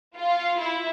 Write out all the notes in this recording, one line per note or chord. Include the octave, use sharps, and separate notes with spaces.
F4
E4